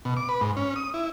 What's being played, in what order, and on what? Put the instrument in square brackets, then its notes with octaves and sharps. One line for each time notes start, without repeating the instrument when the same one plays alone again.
[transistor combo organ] B2
D6
B4
G#2
C#4
D#6
E4